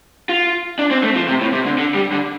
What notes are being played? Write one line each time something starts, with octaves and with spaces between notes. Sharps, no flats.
F4
D4
C4
A3
F3
C3
A2
C3
D3
D3
G3
D3